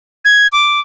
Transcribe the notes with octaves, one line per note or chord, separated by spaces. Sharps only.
G#6
D6